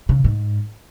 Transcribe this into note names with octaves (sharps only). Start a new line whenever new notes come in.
C#3
G#2